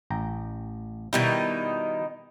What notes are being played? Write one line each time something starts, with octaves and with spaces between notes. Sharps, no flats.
A1 G5 A#5
B2 D#3 G3 D#4 E4